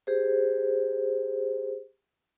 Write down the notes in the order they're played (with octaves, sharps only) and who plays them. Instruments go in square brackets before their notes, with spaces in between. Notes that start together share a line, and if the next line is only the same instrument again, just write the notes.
[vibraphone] G4 G#4 C5